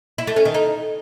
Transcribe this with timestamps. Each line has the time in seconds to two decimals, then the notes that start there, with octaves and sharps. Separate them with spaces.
0.18 E4
0.27 A3
0.36 C#4
0.45 D#3
0.54 D#4